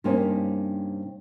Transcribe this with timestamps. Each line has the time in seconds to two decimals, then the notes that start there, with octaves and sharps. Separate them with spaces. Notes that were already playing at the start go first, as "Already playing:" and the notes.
0.04 G2 C3 A#3 C4 C#4 D#4